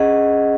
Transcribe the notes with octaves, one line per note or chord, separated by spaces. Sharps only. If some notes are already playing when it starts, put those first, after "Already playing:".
Already playing: C#4 G#4 D#5 F#5